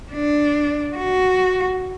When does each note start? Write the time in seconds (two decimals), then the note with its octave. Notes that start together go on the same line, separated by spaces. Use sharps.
0.12 D4
0.96 F#4